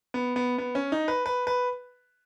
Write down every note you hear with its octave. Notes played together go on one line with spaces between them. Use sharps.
B3
B3
B3
C#4
D#4
B4
B4
B4